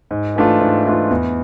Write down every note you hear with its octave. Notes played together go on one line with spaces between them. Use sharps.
G#2
E3 A3 D4 F4
G#2
E3 A3 D4 F4
E2